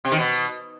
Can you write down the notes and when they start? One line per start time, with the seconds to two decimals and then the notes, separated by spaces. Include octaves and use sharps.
0.05 C3
0.12 D#3
0.19 B2